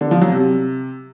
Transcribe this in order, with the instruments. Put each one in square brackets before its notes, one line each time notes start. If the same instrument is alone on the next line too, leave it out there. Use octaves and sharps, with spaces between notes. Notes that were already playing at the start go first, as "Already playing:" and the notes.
[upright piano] D3
F3
F#3
C3